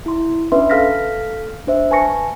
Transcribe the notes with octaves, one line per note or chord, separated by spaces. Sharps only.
E4 C6
C#4 D4 B4 E5 C6
A4 F5 F6 A#6 B6
D4 C5 E5
B4 G#5 A5 C#6 A#6 C#7